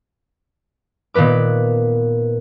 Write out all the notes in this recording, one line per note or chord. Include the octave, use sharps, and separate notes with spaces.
A#2 D#3 B3 B4 D6